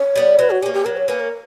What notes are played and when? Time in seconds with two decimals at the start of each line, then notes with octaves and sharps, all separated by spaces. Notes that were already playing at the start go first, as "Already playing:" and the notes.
Already playing: C#5
0.16 G3 B3
0.39 F#3 B4
0.51 F#4
0.62 A#3 C#4 G4
0.74 G4
0.85 F#3 A#4
0.97 C#5
1.08 A#3 C#4 B4
1.20 A#4